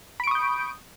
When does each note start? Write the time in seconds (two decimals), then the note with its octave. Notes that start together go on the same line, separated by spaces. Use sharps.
0.20 B5
0.24 D7
0.27 C#6
0.31 D#6
0.35 G6